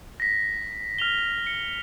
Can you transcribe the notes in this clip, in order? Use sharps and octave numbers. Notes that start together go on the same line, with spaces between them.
A#6 B6
F6 F7 G7
C#7